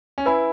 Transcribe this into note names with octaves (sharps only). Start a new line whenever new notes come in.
C#4
E4 B4 G#5 B5